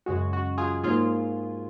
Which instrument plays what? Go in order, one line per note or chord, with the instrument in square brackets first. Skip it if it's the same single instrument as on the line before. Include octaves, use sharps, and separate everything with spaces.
[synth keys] F#2 C#3 G#3 F#4
F#4
F4 G#4
G#2 F#3 A#3 F4 G#4